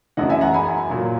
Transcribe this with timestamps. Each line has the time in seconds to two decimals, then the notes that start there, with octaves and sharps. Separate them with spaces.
0.17 F#2 E3 D#5 F#5
0.29 E5 G#5
0.41 F#5 A#5
0.54 G#5 B5
0.90 A#2 F#3